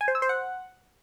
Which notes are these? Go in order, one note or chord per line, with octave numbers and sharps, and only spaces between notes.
G#5
C5
E6
C5
F#5